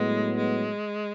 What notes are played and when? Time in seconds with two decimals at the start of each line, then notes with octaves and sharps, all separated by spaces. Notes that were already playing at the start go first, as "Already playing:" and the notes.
Already playing: A2 F#3 G#3 B3
0.37 G#3